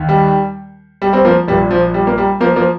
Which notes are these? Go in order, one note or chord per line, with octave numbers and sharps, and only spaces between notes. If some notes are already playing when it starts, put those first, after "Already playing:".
Already playing: D#2 D#3
G3
G3
G3 C4
F3 A#3
A#1 A#2 G3
F3
G3
A#3
G3
F3 A#3
F3 A#3